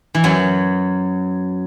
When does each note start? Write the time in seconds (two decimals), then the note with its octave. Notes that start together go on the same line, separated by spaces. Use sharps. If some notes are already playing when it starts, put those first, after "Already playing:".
0.15 E3
0.24 F#2 F#3